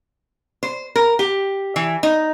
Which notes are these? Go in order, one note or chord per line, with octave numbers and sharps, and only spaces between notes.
C5
A#4
G4
E3
D#4